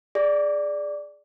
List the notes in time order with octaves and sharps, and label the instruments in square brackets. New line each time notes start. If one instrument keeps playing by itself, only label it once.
[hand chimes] G#4 D5